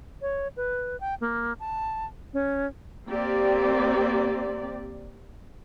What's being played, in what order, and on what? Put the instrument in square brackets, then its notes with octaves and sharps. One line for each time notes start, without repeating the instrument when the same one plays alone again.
[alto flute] C#5
B4
G5
A#3
A5
C#4
[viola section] A#3 C4 G4 D5